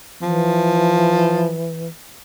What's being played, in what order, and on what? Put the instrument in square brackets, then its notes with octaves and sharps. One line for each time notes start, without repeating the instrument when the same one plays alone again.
[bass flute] E3 [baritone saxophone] F3